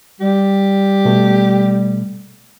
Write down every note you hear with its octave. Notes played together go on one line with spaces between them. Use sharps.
G3 G4
B2 A3